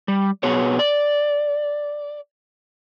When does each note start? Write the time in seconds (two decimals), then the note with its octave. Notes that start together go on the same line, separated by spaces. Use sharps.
0.08 G3
0.43 B2 B3 F#4 G#4 C#5
0.79 D5